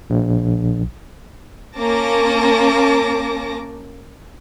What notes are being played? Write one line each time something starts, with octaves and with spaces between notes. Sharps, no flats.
A#1
A#3 C#4 A5 D6 A#6